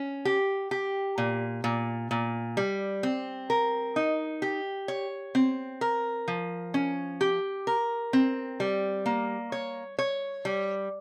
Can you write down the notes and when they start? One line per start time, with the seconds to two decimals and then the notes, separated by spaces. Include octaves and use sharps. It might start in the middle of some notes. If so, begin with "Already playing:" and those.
Already playing: C#4
0.25 G4
0.71 G4
1.18 A#2
1.64 A#2
2.11 A#2
2.57 G3
3.03 C4
3.50 A#4
3.96 D#4
4.42 G4
4.88 C#5
5.35 C4
5.81 A#4
6.28 F3
6.74 C#4
7.21 G4
7.67 A#4
8.13 C4
8.60 G3
9.06 A#3
9.52 C#5
9.99 C#5
10.45 G3